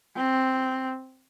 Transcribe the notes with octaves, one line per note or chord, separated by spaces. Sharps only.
C4